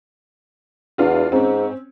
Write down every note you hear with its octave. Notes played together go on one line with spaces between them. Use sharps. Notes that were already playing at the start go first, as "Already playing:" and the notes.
E2 D4 F4 F#4
G#2 C4 C#4